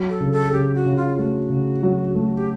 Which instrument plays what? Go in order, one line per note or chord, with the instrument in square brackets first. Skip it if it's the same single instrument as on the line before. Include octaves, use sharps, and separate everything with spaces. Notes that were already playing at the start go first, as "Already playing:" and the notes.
Already playing: [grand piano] F#3
[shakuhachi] A4
[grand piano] C#3
[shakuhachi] A4
[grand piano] C#3 [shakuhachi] G4
[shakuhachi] F#4
[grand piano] C#3
[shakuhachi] F4
[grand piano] A3 [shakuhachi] F#4
[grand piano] C#3
F#3
A3
[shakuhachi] G4